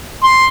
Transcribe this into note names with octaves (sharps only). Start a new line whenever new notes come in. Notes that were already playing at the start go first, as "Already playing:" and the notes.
C6